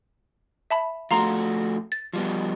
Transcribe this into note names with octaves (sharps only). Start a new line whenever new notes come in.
E5 A5 B5
F3 A3 F#4 F5 A#5 C6
A6
F3 G3 B3